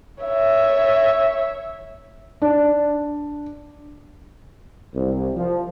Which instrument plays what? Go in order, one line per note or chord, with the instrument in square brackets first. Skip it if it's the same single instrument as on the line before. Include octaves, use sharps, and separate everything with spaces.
[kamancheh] C#5 E5
[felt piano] D4
[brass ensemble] C2
F3